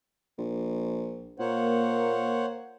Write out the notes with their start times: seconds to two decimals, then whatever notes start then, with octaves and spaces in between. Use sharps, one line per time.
0.38 A#1
1.40 A#2 A#3 C5 C#5 F#5